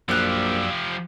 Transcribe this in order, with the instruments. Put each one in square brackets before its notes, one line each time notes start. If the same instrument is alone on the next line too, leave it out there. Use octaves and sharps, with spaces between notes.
[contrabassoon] A#1 [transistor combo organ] F#2 D5 E6 [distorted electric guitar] F3 G4 [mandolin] F5 F#6